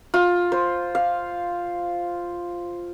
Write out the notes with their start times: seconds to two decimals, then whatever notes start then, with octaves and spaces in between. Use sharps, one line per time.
0.14 F4
0.52 C5
0.95 F5